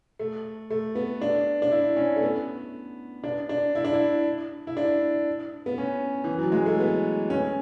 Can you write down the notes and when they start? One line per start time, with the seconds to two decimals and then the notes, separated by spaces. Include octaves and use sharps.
0.19 A3
0.70 A3
0.95 B3
1.21 D4
1.62 D4
1.71 E4
1.96 C#4
2.16 A3
2.22 B3
3.24 D4
3.49 D4
3.75 E4
3.85 D4
3.94 E4
4.67 E4
4.77 D4
5.66 B3
5.78 C#4
6.24 E3
6.38 F#3
6.52 G#3
6.66 A3
6.80 B3
7.30 C#4